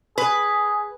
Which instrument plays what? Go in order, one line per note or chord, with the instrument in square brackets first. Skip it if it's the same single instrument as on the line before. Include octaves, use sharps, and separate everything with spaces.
[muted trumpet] G#4 [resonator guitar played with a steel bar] B4